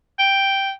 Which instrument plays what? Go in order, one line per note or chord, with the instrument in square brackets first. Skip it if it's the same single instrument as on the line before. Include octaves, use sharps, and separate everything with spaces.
[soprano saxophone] G5